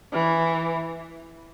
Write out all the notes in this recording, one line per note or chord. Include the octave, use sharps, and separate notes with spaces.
E3